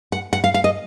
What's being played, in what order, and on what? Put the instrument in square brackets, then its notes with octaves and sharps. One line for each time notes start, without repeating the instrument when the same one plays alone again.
[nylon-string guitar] F#5
F#5
F5
F5
D#5